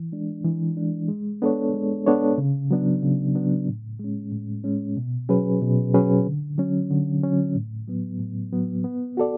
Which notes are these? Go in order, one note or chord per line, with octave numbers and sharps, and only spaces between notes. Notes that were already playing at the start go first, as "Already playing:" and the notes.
Already playing: E3
G#3 D4
E3
G#3 D4
G#3
B3 D4 A4 C#5
G#3
B3 D4 A4 C#5
C#3
F#3 B3 D4
C#3
F#3 B3 D4
A2
G#3 C#4
A2
G#3 C#4
B2
F#3 C#4 G#4 B4
B2
F#3 C#4 G#4 B4
D3
F#3 C#4
D3
F#3 C#4
A2
F#3 B3
A2
F#3 B3
B3
F#4 A4 D5